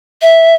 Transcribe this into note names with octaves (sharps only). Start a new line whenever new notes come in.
E5